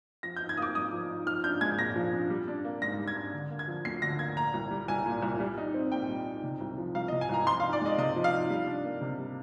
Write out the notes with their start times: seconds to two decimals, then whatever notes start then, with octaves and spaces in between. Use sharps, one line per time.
0.23 F3 A#6
0.36 G6
0.41 D#4
0.49 G#6
0.57 A#3 D6 D#6
0.75 G2 D#6
0.92 F3
1.10 D#4
1.26 F3 F6
1.44 D4 G6
1.61 G#3 G#6
1.78 A#2 A#6
1.96 F3
2.13 D4
2.30 G3
2.48 D4
2.65 A#3
2.82 G#2 A#6
2.99 G3
3.08 G#6
3.16 D4
3.34 D3
3.51 A#3
3.59 G#6
3.68 F3
3.85 D2 C7
4.02 D3 A#6
4.19 A#3 G#6
4.36 A#2 A#5
4.54 C2
4.71 G3
4.88 C2 G#5
5.06 A#2
5.22 C2
5.40 G3
5.58 D#4
5.74 C4
5.91 A#2 G5
6.09 G3
6.26 D#4
6.43 C3
6.61 C2
6.78 F3
6.95 C2 F5
7.08 D#5
7.12 C3
7.21 G#5
7.29 C2 A#5
7.47 F3 C6
7.60 F5
7.64 D#4
7.73 D5
7.81 G#3 D#5
7.98 C3 D#5
8.16 F3
8.24 F5
8.33 D#4
8.50 G3
8.67 D4
8.85 A#3
9.01 C3
9.19 G3